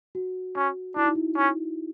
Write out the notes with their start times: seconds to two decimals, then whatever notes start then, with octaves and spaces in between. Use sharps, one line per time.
0.15 F#4
0.56 C#4 F#4
0.96 D4 E4
1.06 D#4
1.15 E4
1.36 C#4